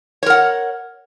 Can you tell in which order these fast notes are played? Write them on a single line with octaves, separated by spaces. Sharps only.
C#5 A#4 F#5